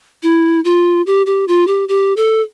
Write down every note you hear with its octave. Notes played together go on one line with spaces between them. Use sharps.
E4
F4
G4
G4
F4
G4
G4
A4